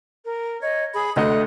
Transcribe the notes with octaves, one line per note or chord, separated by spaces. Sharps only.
A#4
C#5 D#5
G#4 B5
D2 A3 D#5 D#6 F#6